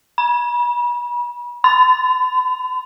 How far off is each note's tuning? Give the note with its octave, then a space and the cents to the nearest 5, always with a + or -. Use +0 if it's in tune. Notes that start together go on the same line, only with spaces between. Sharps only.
B5 -35
B5 +45